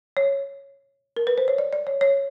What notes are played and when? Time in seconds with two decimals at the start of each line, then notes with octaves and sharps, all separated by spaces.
0.17 C#5
1.17 A#4
1.27 B4
1.38 C5
1.48 C#5
1.58 D5
1.73 D5
1.87 C#5
2.01 C#5